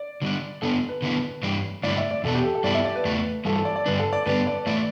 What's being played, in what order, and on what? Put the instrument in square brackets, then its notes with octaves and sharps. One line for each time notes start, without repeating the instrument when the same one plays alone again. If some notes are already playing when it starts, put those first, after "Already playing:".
Already playing: [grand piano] D5
[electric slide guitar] D3 G3 D4
[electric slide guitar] D3 B3 D4 [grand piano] A4
[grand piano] B4
[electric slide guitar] D3 B3 E4
G2 E3 G3 D4
[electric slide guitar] G2 D3 A3 E4 [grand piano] D5
[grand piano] E5
D5
[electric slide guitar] E2 B2 B3 D4 [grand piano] A4
[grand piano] G4
A4
A4
[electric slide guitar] G2 G3 B3 E4 [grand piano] D5
[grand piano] E5
D5
B4
[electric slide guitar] E2 E3 A3
[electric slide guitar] G2 E3 G3 [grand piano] A4
[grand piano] A4
D5
D5
[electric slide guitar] G2 D3 G3 D4 [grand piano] B4
[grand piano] A4
D5
[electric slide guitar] G2 D3 G3 B3 D4 [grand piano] B4
[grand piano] D5
[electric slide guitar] A2 E3 A3 E4 [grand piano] D5